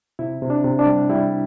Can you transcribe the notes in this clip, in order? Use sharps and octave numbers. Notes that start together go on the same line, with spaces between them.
C3 E4
C3
D4
C3
D4
G3
G3 E4